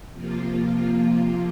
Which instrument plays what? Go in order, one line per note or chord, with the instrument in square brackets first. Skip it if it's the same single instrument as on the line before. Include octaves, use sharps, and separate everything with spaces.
[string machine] C3 F3 A#3 F4